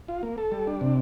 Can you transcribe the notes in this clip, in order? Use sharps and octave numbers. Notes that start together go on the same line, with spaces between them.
F4
A#3
A4
G3
D4
C3